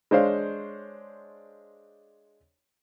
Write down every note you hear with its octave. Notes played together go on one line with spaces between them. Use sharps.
G#3 D4 C5 C#5 F5